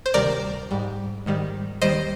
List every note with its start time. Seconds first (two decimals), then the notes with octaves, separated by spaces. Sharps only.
0.06 C5
0.14 D2 C3 D#3 G3 A#4 D5
0.71 G#2 G3
1.26 G#2 D#3 G3
1.82 D#2 D#3 G3 C5 D#5